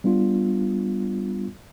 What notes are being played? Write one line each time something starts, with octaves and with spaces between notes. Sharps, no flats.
G3 B3 D4 F4